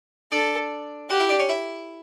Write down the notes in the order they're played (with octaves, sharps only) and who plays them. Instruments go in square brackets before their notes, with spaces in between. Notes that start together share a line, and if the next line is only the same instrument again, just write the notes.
[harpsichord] D4 D5 [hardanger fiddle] A4
[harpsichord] F#4 F#5 [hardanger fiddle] G4
[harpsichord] E4 E5
D4 D5
C#4 C#5
E4 E5